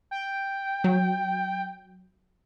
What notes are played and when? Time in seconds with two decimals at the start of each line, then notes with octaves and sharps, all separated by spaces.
0.11 G5
0.84 F#3